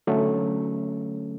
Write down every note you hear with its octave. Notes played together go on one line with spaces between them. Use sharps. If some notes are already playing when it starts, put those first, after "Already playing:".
D3 F#3 A3 C#4